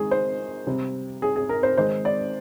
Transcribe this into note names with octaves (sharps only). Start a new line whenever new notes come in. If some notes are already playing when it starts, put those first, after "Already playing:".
Already playing: D#3 G#3 G#4
C5
C3 G3 C4
G#4
G#4
A#4
C5
D#3 G#3 C4 C5
D5